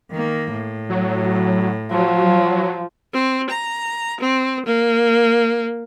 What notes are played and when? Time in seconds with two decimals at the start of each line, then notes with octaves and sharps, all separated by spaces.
0.11 D#3 A#3
0.51 A2
0.90 F#3
1.91 F3 F#3
3.14 C4
3.50 A#5
4.20 C4
4.65 A#3